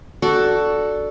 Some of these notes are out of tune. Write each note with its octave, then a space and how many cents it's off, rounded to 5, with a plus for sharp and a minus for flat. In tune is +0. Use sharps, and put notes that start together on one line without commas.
D4 +0 F#4 +10 A4 +0